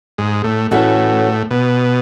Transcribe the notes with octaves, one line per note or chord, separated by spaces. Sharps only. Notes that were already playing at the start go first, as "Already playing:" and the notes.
G#2
A2
A2 E3 A3 C#4 F#4 A4
B2